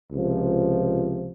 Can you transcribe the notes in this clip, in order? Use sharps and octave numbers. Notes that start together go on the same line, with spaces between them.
C#2 C3 F3